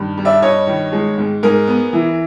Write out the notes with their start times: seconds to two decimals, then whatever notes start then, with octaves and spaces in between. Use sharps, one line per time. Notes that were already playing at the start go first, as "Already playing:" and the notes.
Already playing: G2 D#3
0.17 G3
0.25 D5 E5
0.42 G2 C#5 D#5
0.67 D#3
0.92 G#3
1.18 G#2
1.43 G#2 G#4 A#4
1.68 B3
1.93 E3